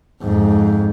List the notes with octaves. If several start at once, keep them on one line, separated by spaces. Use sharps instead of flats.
F2 G#2